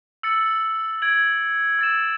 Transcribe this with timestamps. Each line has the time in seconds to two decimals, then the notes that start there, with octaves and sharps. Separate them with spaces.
0.23 E6 A6 C#7 F#7
1.02 G#6 D7 F#7
1.79 E6 A6 E7